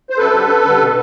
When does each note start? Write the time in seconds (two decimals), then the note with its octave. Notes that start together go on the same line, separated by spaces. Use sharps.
0.10 C5
0.18 F#2 A4 B4
0.34 D3 G3
0.49 F#2
0.65 D3 G3
0.80 B2